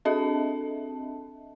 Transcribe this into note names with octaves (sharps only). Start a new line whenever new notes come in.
C4 D4 A4 D#5 E5 A5